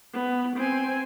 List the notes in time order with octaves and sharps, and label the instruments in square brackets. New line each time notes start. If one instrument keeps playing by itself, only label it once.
[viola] B3
C4 G#5